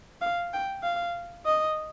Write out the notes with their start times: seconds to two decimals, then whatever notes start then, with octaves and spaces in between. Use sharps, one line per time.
0.22 F5
0.53 G5
0.83 F5
1.46 D#5